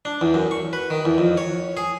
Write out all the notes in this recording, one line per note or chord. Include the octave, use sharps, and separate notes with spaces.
D4
E2
F#2
C#6
B4
D#3
E2
F2
C#5
G#4